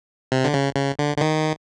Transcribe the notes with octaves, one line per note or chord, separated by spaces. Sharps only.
C3
D3
C#3
C#3
D3
D3
D#3